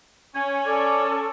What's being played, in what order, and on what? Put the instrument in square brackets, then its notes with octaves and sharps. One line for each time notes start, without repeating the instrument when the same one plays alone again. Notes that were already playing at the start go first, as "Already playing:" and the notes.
[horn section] C#4 [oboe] G#5
[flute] A4 [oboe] D5